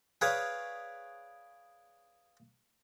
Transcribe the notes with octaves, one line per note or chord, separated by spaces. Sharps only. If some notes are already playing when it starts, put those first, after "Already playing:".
G#4 B4 C#5 D5 F5 D#6